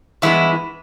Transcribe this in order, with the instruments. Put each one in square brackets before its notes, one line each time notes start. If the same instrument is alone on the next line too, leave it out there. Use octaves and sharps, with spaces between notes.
[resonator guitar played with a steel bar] G2 E3 G#3 B3 E4